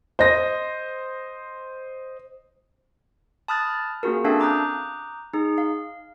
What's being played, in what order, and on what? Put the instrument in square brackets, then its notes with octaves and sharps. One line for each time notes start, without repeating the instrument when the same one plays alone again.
[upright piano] C5 D#5 A#6
[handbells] A5 B5 D#6 F6 F#6 A6
A#3 C#4 F4 F#4 G#4 A#4
C4 D4 A4 E5 F5 A5
A#5 D6 D#6 F#6 G6
D#4 G#4
F5